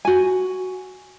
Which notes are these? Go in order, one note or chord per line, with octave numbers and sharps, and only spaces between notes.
F#4 G#5